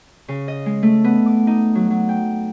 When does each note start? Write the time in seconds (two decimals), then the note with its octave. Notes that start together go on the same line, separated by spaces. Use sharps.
0.28 C#3
0.48 D#5
0.66 G#3
0.83 A3
1.04 B3
1.26 D6
1.47 D#4
1.75 F#3
1.90 F#3
2.09 G5